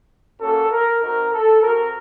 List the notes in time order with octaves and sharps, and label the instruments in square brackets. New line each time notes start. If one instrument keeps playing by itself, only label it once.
[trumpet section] A#3 C#4 F#4 A4
A#4
C4 D#4 F#4 A#4
A4
C4 F#4 A#4